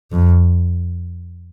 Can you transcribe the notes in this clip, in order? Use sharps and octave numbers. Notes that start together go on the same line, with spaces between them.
F2